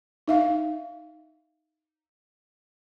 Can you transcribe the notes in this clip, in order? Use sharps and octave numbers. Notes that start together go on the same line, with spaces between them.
D#4 E5 F5